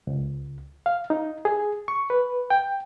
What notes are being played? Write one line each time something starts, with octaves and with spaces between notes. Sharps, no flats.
C#2
F5
D#4
G#4
C#6
B4
G5